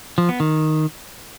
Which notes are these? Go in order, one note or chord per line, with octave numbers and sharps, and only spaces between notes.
F3
B3
D#3